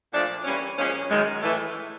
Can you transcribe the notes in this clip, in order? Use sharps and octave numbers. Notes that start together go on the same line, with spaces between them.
A#2 F3 A3 D4
E3 G3 A#3 C#4
A#2 F3 G#3 C#4
F#2 D#3 G#3
A2 E3 A3